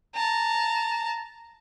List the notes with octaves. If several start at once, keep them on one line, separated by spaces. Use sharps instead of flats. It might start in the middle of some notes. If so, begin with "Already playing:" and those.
A5 A#5